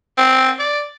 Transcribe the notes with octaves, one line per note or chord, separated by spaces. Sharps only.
C4
D5